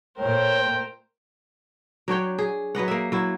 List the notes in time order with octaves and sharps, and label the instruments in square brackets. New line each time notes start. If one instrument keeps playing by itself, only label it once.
[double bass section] A#2 A3 [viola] A#4 C5 [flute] C#5 [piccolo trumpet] G5
[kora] F#3 D4 C#5 G5
G#4
F#3 B4 D#5 F#5
A#3 E5
F#3 E4